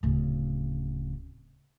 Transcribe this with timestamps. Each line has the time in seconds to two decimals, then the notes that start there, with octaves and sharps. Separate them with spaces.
0.03 D1 C#3